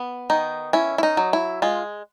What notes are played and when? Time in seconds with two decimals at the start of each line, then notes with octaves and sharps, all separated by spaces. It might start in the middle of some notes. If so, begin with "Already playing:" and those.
Already playing: B3
0.30 D#3 D#4
0.73 C#4 E4
0.98 E4
1.03 D#4
1.17 F#3
1.33 E4
1.62 G#3 F4